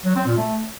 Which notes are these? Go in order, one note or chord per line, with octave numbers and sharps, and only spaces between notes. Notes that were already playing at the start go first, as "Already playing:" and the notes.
F#3
C4
A#2
A3